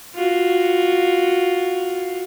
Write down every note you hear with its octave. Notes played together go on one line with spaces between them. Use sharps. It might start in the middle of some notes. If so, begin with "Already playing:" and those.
F4 F#4